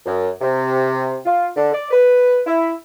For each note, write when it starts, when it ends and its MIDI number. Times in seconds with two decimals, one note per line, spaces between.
0.06 0.28 42
0.42 1.19 48
1.25 1.47 65
1.56 1.71 50
1.73 1.90 74
1.91 2.41 71
2.46 2.72 64